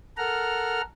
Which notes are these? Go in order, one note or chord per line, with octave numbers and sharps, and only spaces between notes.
A4 A#4 F#5 A#5 F6